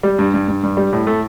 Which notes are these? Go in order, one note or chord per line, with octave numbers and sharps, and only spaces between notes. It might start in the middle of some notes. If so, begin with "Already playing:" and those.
G3
G2
G2
G2
G2
G3
A2
A3